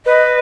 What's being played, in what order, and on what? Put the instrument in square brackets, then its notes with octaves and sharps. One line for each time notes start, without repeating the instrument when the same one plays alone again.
[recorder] B4 [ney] D#5